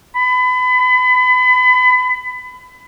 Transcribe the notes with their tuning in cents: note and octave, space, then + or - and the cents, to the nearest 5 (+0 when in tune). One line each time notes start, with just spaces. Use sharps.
B5 +30